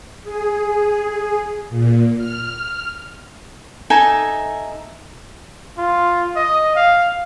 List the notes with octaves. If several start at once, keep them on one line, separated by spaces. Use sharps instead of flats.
G#4
A#2
F6
D#4 A4 E5 G#5
F4
D#5
F5